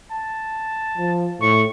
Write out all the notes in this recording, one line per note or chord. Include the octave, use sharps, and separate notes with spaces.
A5
F3
A2 C#6